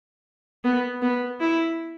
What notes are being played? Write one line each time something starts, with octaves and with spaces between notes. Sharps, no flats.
B3
B3
E4